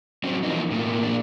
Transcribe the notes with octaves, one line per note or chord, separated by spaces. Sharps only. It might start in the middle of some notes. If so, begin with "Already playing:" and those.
F#3 C4 C#4
E3 F3 A#3 B3 D#4
A2 A#3
A#2 D4